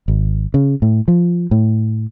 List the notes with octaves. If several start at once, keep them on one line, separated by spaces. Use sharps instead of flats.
G#1
C#3
A2
F3
A2